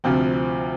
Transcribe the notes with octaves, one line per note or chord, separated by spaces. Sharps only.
D2 C3 F3 C4 F4